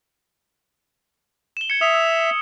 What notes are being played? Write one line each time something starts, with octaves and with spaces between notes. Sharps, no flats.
E7 G7
G#6 C#7
E5 D#6 F7
E6